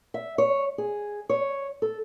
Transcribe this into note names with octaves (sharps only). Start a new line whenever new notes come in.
E5
C#5
G#4
C#5
A4